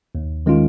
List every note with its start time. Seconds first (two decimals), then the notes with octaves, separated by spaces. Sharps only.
0.15 D#2
0.46 D#3 G#3 C#4 F4